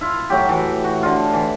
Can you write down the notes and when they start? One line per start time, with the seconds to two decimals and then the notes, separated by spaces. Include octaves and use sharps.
0.01 E4 F4
0.30 A2 F#3 G4
0.49 E3
0.84 F#4
1.03 D3 F4
1.33 E3